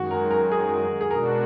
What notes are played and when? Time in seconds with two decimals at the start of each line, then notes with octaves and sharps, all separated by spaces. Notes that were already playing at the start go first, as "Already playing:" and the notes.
Already playing: F#2 D#3 G#3 F#4
0.11 A#4
0.31 A#4
0.51 G#4
1.01 G#4
1.11 B2 G#3 D4 F#4 A#4